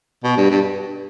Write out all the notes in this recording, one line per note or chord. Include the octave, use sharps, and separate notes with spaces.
B2
G2
G2